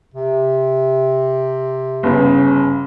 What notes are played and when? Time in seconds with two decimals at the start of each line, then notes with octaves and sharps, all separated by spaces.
0.14 C3
2.03 G1 C#3